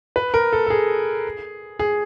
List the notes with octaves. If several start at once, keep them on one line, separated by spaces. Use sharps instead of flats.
B4
A#4
A4
A4
G#4
G#4